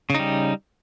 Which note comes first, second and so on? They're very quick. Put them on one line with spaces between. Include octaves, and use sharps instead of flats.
C#3 D#4 G3